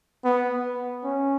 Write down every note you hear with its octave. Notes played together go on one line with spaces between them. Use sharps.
B3
C#4